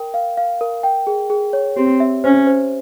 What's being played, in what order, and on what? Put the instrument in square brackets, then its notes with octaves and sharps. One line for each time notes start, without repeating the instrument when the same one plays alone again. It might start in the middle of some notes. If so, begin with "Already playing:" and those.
Already playing: [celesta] A#4 G5
F5
F5
A#4
G5
G#4
G#4
C#5
[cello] C4 [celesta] G4
[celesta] E5
[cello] C#4 [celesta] C5
[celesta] C5